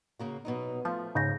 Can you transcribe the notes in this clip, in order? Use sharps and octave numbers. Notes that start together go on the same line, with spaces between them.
C#3 A#3 F#4
B2 F#3 D#4
F3 A3
G#2 C#3 D#4 G6 A#6